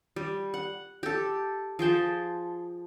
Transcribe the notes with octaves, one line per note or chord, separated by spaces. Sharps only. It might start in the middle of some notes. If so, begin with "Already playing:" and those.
G3
F#5
G4 A4
F3 G#4 G5 A5